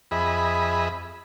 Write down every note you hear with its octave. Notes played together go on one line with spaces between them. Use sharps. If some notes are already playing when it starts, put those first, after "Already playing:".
F2 G#4 D#5 E5 B5